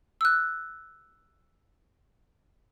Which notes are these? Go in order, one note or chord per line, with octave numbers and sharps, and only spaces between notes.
E6 F#6